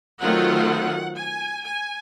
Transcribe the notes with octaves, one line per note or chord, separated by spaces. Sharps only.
D#3 F#3 A3 C4 F4 F#5
G#5
G#5